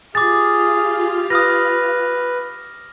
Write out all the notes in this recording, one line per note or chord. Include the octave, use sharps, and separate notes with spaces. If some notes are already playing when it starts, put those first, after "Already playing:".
F4 G4 G#4 F5 D6 A6
B4 D#6 F6 A#6